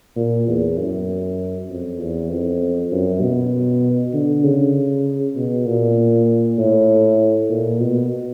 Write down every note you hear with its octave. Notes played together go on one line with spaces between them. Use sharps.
A#2
E2
F#2
F2
E2
F2
F#2
B2
D3
C#3
B2
A#2
A2
A#2
B2